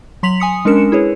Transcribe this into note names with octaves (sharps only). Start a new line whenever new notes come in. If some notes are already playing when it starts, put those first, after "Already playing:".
F#3 C6 B6 F7 F#7
G#5 D#6 C#7
G#3 C#4 D4 A#4 C#7 E7
E4 G#4 B4 C#5